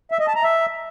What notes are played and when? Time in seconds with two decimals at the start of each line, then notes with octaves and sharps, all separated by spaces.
0.11 E5
0.19 D#5
0.27 A5
0.35 A#5
0.43 E5